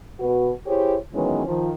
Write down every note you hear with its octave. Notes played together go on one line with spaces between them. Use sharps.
B2 F#4 B4
E4 G4 G#4 C5 C#5
D#3 E3 F#3 G#3 B3 C#4
D#3 F3